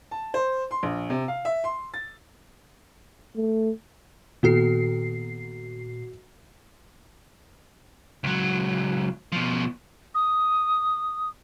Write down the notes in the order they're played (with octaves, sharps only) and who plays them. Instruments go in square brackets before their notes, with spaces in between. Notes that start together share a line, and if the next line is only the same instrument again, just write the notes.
[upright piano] A5
C5
C6
A#1
C3
F5
E5
C6
A6
[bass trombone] A3
[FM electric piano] A#2 C7 [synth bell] D#3 B3 A4 [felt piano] F#4
[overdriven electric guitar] C#2 F#3
B2 F3
[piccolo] D#6